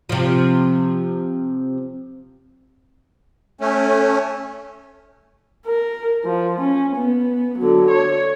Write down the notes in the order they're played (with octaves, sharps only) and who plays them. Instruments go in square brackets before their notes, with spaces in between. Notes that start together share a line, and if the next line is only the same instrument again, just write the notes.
[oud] C3 F3
[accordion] A3 C#4
[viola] A#4
F3
C#4
B3
D3 F#3
C#5